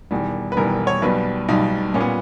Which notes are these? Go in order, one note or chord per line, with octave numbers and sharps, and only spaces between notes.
E1 E2 D#3 G3
B4
E1 E2 D#3 G3 A#4
C#5
B1 B2 G3 B4
B1 B2 G3 D#4
A#2 G3 C#4
B3